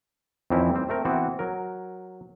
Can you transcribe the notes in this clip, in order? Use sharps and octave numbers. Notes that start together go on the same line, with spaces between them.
F2 D#3 E3 C4 C#4 E4
G3 C4
A3 C4 A#4
E3 B3 C4 F#4
F#3 A#4